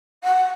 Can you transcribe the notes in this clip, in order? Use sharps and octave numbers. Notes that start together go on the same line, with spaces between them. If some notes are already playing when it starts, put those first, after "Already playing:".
F#5